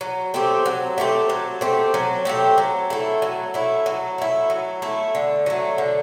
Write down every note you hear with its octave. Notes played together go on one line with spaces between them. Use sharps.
F#3
A3 C4 G4
F#3
A3 C4 G4
F#3
A3 C4 G4
F#3
A3 C4 G4
F#3
A3 E4
F#3
A3 E4
F#3
A3 E4
F#3
A3 E4
D3
F#3 A3
D3